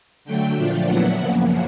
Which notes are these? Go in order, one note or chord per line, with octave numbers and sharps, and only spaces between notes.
D3 F#3 A3 G5
A#2 F3 A3 D4 F4
A#2 F#3 B3 E4 F#5
F#2 C#3 F3 A#3